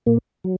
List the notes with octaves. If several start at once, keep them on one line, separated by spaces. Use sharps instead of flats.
A#2 A#3
F#3